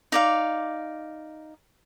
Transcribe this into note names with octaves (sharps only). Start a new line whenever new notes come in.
D#4 D5 F5